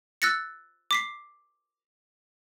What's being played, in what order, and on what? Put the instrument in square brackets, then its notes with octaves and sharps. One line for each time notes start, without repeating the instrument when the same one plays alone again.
[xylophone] E6 F#6 A6 A#6 C#7
D6 B6 C7